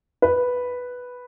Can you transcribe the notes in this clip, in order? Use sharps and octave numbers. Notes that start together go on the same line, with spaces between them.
B4